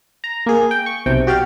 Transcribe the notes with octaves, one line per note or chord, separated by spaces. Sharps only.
A#5
A#3 G#4
G5
C#6
B1 C3 G5
F#4 G4 D5 F5